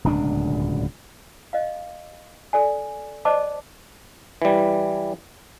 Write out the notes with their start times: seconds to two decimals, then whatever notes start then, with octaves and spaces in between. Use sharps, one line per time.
0.04 D1 C#2 B2 D4
1.53 D#5 F5
2.53 A4 D5 G#5
3.25 C5 D5 D#5 A5 D6
4.42 E3 G3